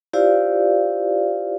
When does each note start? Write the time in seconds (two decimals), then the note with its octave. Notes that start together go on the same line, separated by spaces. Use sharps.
0.13 E4 F4 G4 C5 D5 F5